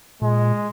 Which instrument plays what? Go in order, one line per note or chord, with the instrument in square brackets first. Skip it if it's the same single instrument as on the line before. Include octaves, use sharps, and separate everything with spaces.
[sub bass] A#2 [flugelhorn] G#3